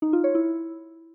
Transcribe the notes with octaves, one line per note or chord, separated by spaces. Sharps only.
D#4
F4
C#5
E4